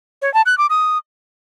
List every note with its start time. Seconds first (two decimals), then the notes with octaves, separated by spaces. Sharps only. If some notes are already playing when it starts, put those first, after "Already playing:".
0.22 C#5
0.34 A5
0.46 F#6
0.58 D6
0.70 D#6